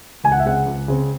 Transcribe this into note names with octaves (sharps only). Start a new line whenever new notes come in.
C#2 G#5
F#5
E5
C#3 G#3 C4 F#5
C#2
C#3 G#3 C4